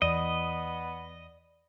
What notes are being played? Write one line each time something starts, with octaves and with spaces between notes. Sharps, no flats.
E2 B3 D5 D#5